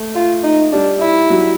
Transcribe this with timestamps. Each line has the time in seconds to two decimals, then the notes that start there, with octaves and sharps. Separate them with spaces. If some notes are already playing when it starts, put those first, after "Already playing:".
Already playing: A3
0.15 F4
0.43 D#4
0.72 G3 D4
1.01 E4
1.30 F#3